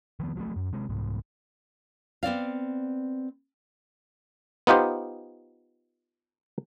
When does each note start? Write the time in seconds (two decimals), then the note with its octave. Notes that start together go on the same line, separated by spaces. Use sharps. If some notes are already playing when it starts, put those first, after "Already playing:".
0.20 D#3 F3 B3
0.36 F3 F#3 G#3 A3
0.56 F#2
0.73 C3 G#3
0.89 C2 G#2
2.23 B3 C4 D5 F5
4.67 B3 D#4 F4 G4 C5